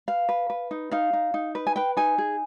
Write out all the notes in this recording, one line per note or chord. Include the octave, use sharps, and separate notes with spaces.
B4 F5
B4
B4
D#4
D#4 F5
D#4
D#4
B4
G#5
B4 G5
D#4 G#5
G#4